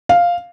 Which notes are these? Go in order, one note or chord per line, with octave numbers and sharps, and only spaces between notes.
F5